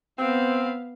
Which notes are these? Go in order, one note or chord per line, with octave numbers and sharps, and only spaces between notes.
B3 C4 F5